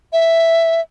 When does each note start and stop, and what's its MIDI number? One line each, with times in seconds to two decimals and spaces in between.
0.13 0.81 76